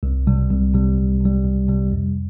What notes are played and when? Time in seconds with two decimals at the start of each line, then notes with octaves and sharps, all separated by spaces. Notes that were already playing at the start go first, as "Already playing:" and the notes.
0.03 C2
0.27 C3 G3
0.50 C2
0.74 C3 G3
0.98 C2
1.21 C3 G3
1.45 C2
1.68 C3 G3
1.91 F2